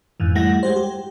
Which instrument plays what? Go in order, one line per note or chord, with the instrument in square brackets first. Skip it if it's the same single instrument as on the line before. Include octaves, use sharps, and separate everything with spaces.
[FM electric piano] F2 G#2 E3
G3 A3 E4 F#5 A#6
G#3 G4 C5
G4